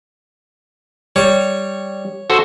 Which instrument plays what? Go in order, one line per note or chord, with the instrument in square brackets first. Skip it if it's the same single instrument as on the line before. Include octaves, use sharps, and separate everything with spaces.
[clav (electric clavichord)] G3 [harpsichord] C#5
[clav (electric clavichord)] F#4 A4 C5